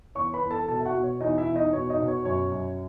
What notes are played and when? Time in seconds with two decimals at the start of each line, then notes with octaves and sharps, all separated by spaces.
0.15 E2 C#5 C#6
0.33 B4 B5
0.41 E2
0.51 A4 A5
0.68 B2 A4 A5
0.79 E5
0.85 F#4 F#5
0.94 B2
1.03 C#5
1.21 E2 D#4 D#5
1.38 E4 E5
1.47 E2
1.55 D#4 D#5
1.73 B2 C#5
1.90 D#4 D#5
1.99 B2
2.08 C#5
2.25 F#2 C#5
2.52 F#2